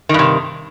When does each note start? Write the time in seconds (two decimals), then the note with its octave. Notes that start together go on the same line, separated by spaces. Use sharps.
0.09 D#3
0.14 G2
0.19 C3